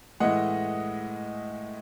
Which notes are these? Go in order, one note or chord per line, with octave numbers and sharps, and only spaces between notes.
A2 E3 G#3 D#5 F#5